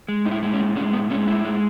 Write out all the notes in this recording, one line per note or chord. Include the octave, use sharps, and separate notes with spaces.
G#3
A2 D#4
E4
G#3
C#4
A2
G#3 C#4
A2 B3
G#3 C#4
A2 E4
G#3